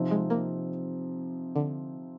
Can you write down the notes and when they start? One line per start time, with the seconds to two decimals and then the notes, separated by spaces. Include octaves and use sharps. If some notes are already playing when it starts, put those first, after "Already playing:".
Already playing: C3 F3 C4 D#4
0.11 G#3
0.30 A#3
1.56 D3